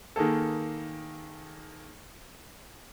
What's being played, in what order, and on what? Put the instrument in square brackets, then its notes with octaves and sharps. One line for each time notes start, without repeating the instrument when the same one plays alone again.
[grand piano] D#3 A#3 G#4 A4